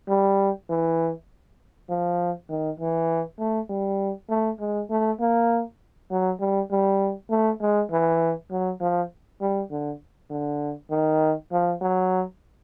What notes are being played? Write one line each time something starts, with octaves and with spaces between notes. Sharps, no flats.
G3
E3
F3
D#3
E3
A3
G3
A3
G#3
A3
A#3
F#3
G3
G3
A3
G#3
E3
F#3
F3
G3
D3
D3
D#3
F3
F#3